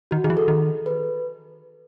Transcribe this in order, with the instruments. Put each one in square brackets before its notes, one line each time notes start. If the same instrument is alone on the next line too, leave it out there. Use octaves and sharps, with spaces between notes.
[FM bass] D#3 [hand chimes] F#4
[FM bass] D#3 [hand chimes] G#4
[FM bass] E3
[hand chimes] A4
[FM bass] D#3
[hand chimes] B4